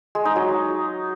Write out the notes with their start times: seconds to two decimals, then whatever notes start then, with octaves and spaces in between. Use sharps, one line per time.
0.15 G#3
0.25 D#4
0.36 F#3